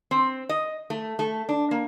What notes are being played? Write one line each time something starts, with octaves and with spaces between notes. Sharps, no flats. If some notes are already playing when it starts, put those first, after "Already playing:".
C4
D#5
A3
A3
D4
A#3